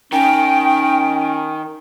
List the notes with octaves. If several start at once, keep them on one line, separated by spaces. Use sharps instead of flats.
D#3 C#4 G5